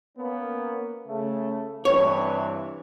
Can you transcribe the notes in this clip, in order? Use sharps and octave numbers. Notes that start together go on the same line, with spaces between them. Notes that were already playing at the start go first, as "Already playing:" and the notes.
A#3 B3 C#4
C#3 A3
G2 C3 E3 C#5